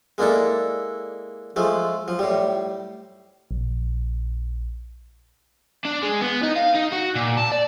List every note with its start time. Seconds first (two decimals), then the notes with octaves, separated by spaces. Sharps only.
0.18 G#3 A#3 D4 E4 A4
1.56 F3 G#3 A3
2.08 F3
2.19 A2 G3
3.51 A#1
5.85 D4
6.03 G#3
6.21 B3
6.43 D#4
6.56 F5
6.75 D#4
6.93 F#4
7.15 A#2
7.37 A5
7.52 D5